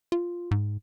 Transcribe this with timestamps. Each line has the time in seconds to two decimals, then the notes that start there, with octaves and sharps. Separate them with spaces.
0.12 F4
0.51 G#2